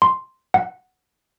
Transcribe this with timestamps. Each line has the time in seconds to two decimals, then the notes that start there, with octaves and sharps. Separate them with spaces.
0.02 C6
0.54 F#5